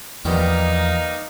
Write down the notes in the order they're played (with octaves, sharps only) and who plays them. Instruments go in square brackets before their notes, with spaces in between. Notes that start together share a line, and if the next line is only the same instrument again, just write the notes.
[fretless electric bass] E2 F3 [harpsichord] D#3 G3 B3 [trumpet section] A#3 D#4